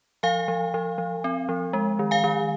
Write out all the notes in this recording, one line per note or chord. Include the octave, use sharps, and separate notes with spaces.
F3 F5 G#5
F3
F3
F3
C4
F3
G#3
D#3
F5 G#5
D#3